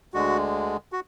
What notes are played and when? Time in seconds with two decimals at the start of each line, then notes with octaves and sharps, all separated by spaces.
0.14 D2 D3 G#3 F#4
0.92 F#4